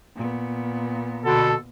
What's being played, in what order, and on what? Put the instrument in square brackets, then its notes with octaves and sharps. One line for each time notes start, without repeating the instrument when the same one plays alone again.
[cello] A#2 B3
[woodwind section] B2 D3 [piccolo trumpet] A4